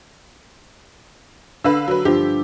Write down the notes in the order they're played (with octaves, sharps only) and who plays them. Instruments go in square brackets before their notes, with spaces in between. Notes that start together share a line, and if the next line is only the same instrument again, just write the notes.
[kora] D3 [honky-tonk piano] B4 F5 E6
[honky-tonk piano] F#3 B4
[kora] G2 F3 F5 [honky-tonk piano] G4